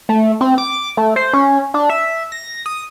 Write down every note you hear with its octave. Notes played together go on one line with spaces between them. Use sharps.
A3
C4
D6
A3
C5
C#4
D4
E5
A#6
D#6